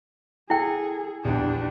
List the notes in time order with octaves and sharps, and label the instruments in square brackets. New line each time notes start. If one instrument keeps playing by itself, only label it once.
[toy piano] E4 G5 [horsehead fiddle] G#4 [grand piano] A4
[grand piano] A#1 E2 [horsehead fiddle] D4 G4